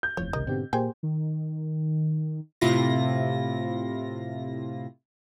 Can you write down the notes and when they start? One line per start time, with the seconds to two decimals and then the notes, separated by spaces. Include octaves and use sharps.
0.03 G6
0.17 F1 E2 F3 C#5
0.33 G#1 C#2 C3 D#3 A#4 D#5
0.47 G#2 B2 D3 C4 G4
0.73 A#2 A#3 G4 G#4 C5 G5 G#5
1.03 D#3
2.61 A2 C3 E4 F4 A#6